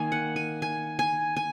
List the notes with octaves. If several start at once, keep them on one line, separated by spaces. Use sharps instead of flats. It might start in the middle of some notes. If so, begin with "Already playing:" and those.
Already playing: D#3 A#3 G#5
F#5
G#5
G#5
G#5
G#5